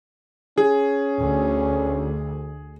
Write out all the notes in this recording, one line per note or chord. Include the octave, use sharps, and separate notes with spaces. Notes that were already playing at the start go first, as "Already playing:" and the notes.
C#4 G#4
D2